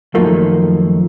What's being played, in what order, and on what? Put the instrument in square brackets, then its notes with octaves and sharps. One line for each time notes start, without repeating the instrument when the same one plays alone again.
[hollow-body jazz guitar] F#2 D#3 F3 A3 A#3